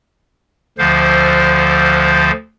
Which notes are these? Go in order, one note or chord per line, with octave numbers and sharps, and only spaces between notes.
D2 D3 F3 C5 F5